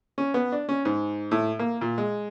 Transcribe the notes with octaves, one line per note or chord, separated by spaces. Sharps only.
C#4
B3
D4
C#4
G#2
A2
A#3
A#2
G#3